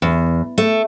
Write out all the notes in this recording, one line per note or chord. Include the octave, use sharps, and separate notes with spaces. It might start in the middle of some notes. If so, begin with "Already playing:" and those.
E2
A3